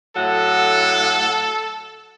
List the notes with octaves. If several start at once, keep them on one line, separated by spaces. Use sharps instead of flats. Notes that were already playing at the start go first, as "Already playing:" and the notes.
A2 F#3 A4 F#5